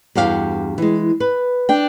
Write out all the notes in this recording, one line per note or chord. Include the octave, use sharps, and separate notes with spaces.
E2 G2 F#4 G4 F5
E3 G#3
B4
D4 G5